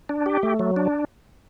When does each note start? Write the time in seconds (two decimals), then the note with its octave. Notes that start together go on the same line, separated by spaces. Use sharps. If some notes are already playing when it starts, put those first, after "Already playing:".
0.09 D4
0.26 G4
0.43 A3
0.59 F#3
0.76 D4